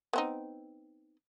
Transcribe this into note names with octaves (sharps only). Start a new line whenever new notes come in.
B3 C4 D#4